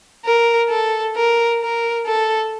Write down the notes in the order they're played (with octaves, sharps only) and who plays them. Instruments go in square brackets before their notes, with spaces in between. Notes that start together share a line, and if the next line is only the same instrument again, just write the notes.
[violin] A#4
A4
A#4
A#4
A4